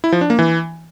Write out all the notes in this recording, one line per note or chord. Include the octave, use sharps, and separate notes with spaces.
E4
F3
D4
A#3
E3